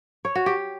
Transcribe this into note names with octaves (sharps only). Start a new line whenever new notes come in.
C#5
F#4
G4